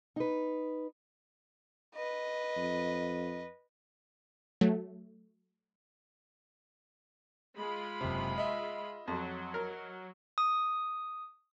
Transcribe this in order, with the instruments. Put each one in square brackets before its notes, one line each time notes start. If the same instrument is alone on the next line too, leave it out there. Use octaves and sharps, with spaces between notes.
[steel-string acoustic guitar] D#4 B4
[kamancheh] B4 D#5
[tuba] F2
[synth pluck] F#3 A3
[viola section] G#3 F4 B5
[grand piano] F#1 C3
D#5 E5
[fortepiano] F2 [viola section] F#3
[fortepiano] A#4
[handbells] D#6